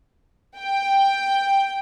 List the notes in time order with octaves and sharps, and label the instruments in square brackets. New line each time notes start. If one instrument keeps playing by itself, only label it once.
[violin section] G5